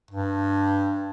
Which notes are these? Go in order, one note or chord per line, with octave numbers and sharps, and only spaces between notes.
G2